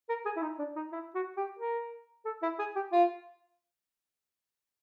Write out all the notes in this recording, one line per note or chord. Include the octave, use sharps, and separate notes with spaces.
A#4
G#4
E4
D#4
D4
D#4
E4
F#4
G4
A#4
A4
E4
G#4
G4
F4